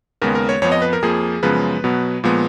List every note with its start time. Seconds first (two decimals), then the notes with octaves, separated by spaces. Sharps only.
0.22 D#2 C#3 G#3 B3 A#4
0.35 A#4
0.49 C#5
0.62 F2 F3 B3 C#5
0.72 D#5
0.82 B4
0.93 A#4
1.02 F2 F3 A#3 G#4
1.43 F#2 C#3 F3 G#3 B3 B4
1.84 B2 F#3 B3
2.24 A#2 F3 G#3 B3